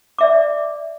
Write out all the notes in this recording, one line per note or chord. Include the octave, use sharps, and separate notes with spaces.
D5 E5 D6